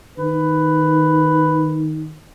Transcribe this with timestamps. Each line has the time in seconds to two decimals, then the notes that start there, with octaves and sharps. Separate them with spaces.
0.18 D#3 B4